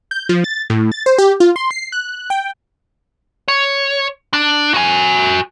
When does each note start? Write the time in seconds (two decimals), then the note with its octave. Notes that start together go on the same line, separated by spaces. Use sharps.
0.11 G6
0.29 F3
0.44 A6
0.70 A2
0.92 A6
1.06 C5
1.18 G4
1.40 F4
1.56 C6
1.71 C7
1.92 F#6
2.30 G5
3.48 C#5
4.34 D4
4.74 F#4 G#5